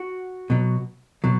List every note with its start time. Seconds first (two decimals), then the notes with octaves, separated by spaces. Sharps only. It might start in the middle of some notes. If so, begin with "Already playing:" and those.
Already playing: F#4
0.50 B2 F#3
1.24 B2 F#3